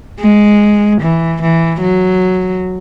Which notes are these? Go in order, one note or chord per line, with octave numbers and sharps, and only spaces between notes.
G#3
E3
E3
F#3